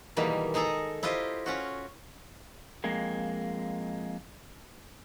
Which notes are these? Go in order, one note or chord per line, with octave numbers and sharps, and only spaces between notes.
B2 D#3 E3 G3 G#3 A#3
G#3 D#4 G#4 A4 A#5
E4 F4 G4 C5 D#5
C#4 F4 F#4
F2 G#3 A#3